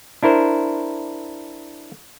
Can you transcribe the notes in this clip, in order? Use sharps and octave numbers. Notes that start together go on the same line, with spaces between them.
D4 E4 A#4 C5